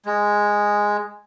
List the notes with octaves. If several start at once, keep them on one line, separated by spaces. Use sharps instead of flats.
G#3